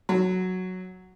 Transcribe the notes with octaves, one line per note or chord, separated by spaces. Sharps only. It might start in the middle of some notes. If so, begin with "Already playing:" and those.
F#3